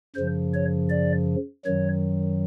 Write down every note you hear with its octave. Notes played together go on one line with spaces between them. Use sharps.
F#2 C#3 F3 C5
C#5
D5
F#2 D#3 F#3 C#5